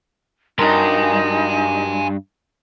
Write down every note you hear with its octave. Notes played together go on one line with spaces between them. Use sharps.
G2 D#4 F#4 A#4 G#5 C6